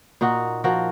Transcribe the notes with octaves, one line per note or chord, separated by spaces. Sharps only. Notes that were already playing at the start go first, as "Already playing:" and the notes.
A#2 D#4 F#4
F3 F#4 A#4